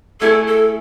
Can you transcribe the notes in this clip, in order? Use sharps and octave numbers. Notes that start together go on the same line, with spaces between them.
A3 E4 G#4 A4
A4